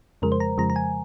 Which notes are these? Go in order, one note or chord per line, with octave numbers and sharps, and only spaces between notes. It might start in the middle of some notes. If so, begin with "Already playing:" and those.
F2 C#3 F3 G#3 A#4
C5
A#5
F2 C#3 F3 G#3 A#5
A#5
G#5